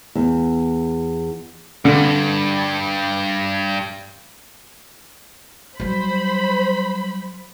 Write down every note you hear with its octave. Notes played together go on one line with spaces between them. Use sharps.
E2
G2 D3
F#3 G3 C5 B5